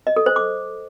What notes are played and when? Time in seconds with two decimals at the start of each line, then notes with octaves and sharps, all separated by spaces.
0.07 D#5
0.16 A4
0.26 C5
0.36 D6